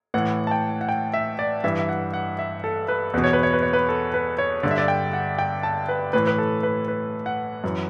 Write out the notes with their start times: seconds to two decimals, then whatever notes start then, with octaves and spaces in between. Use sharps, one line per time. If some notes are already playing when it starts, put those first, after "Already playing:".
0.14 A2 E3 F#5
0.47 A5
0.51 G5
0.81 F#5
0.89 G5
1.13 E5
1.39 D5
1.64 G2 E3 E5
1.79 E5
1.89 F#5
2.14 F#5
2.39 E5
2.64 A4
2.88 B4
3.14 E2 B2 B4
3.24 C#5
3.33 B4
3.43 C#5
3.53 B4
3.63 C#5
3.73 B4
3.89 A4
4.14 B4
4.38 C#5
4.63 G2 D3 D5
4.71 E5
4.78 D5
4.88 G5
5.13 F#5
5.39 G5
5.63 A5
5.89 B4
6.13 A2 E3 B4
6.27 B4
6.38 A4
6.63 B4
6.88 B4
7.26 F#5
7.64 F#2 E3